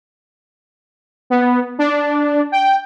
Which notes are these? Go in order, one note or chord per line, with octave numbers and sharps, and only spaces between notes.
B3
D4
G5